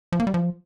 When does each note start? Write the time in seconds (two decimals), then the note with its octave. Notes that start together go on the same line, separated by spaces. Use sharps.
0.12 F3
0.20 A#3
0.27 G3
0.34 F3